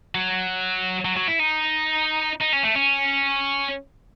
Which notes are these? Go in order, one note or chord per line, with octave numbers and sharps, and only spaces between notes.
F#3
F#3
F#3
E4
D#4
D#4
C#4
A3
C#4